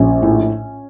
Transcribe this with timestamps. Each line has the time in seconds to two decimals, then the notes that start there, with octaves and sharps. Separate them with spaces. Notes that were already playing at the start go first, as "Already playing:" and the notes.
Already playing: A#1 C#4
0.22 A2